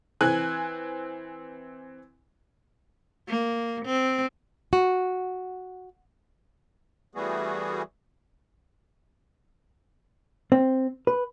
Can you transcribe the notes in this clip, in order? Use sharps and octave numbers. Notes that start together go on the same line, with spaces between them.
E3 C4 G#5 F#6
A#3
C4
F#4
E3 G3 A3 B3 F#4 G#4
C4
B4